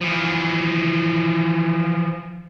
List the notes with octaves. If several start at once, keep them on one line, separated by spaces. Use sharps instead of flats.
E3 F3